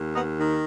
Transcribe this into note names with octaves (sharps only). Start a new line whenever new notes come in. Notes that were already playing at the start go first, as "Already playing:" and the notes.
Already playing: D#2
B3 D#4
D#3